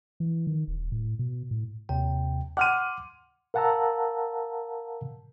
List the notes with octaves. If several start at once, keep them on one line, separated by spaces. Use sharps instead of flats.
E3
D#3
D#1
A2
B2
A2
D#2 C3 G5
F#5 C6 D6 F6 D#7
A#4 F5 F#5 A5 A#5 E6